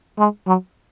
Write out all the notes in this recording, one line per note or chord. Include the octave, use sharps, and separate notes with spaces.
G#3
F#3